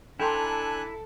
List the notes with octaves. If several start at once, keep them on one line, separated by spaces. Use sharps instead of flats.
D4 E4 A4 G5 G#5 A#5 C6 F#6